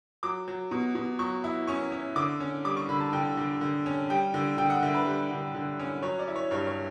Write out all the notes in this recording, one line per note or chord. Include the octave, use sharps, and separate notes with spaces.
F#3 D6
F#3
B2
B2
F#3 C#6
E4
C#4 C#6
C#4
D3 D6
C#4
G3 D6
C#6
D3 B5
A5
D3 G5
D3
D3
C#4
G3 G5
D3
D3 G5
F#5
D3 E5
B4
G3
D3
D3
C#4
F#3 C#5
D5
E4
C#5
G2 C#5
C#5